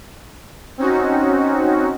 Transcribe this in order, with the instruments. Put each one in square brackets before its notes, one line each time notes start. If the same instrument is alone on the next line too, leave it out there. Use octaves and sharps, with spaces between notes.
[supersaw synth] C4 C#4 D#4 F#4